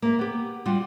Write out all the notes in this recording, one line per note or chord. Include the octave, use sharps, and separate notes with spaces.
A#3 E5
B3 G4
G3 F4 F#4